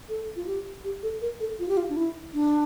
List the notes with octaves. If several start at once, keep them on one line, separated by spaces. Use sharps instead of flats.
A4
F4
G4
G4
A4
A#4
A4
F4
G4
F4
D4
E4
D4